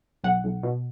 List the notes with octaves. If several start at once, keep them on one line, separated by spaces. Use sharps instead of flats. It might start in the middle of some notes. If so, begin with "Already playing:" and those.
B1 F#5
B1
B2